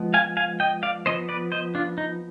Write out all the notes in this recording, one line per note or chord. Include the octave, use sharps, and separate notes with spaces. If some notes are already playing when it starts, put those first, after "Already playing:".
Already playing: F3 G#3 B3
F5 G#5
F5 G#5
D#5 G5
D5 F5
F3 B3 C5 D#5
B4 D5
C5 D#5
D4 F4
D#4